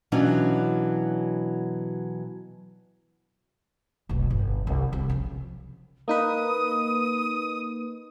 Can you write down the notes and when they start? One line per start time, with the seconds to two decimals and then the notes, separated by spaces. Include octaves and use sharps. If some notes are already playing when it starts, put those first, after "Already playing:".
0.12 B2 E3 F#3 C#4 D4 F4
4.09 F1 B1
4.30 G1
4.67 C2
4.92 C2 C4
5.10 C#3 F3
6.08 A#3 D#4 B4 D#6